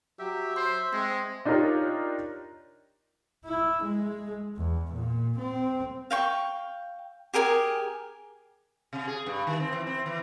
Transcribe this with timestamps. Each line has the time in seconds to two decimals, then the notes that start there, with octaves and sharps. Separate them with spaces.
0.19 F#3 G4 E5
0.56 C5 C6
0.93 G#3 C4 C6
1.45 D4 D#4 F4 G4 A#4 C#5
3.45 E4
3.83 G#3
4.57 E2
4.93 A#2
5.38 C4
6.11 F5 G5 C#6
7.34 G4 G#4 A#4 G#5
8.93 C3
9.07 G#4
9.26 G2
9.47 D#3
9.60 C4
9.73 E3
9.87 C4
10.06 E3